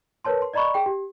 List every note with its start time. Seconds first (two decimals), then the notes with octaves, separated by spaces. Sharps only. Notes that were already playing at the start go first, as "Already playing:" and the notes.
0.25 A#4 B4 C#5 A5 C6
0.42 C6
0.54 D5 D#5 A#5 B5 C#6
0.74 G#4 G5
0.86 G4